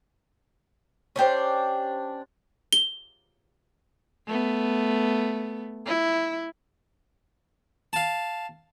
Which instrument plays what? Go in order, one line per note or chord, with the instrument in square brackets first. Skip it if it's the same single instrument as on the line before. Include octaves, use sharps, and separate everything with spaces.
[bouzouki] C#4 D4 G4 C5
[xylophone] G7
[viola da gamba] A3 B3
E4
[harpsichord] F5 A5